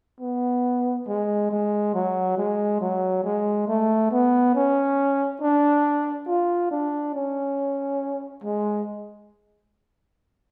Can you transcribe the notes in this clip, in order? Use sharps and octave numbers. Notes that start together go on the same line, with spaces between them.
B3
G#3
G#3
F#3
G#3
F#3
G#3
A3
B3
C#4
D4
F4
D4
C#4
G#3